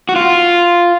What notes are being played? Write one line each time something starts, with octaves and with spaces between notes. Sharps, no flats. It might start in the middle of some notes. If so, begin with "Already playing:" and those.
F#4
F4